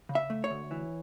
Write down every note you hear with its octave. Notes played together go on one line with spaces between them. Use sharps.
C#3
E5
A3
C#5
D2
E3